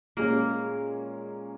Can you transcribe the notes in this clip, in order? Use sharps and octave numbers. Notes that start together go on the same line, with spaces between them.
A#2 G#3 A#3 C#4